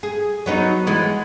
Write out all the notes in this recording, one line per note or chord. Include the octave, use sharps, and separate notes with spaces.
G#4
F#3 B3 D#4
E3 G#3 B3